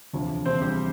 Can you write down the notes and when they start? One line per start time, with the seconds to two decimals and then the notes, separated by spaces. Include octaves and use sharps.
0.13 E1 D2 C3 F3
0.45 E1 D2 C3 F3 C4 C5
0.61 G3 G4